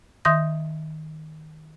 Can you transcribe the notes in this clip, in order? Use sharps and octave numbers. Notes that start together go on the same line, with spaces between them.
D#3 E5 C6 D#6 G6 A#6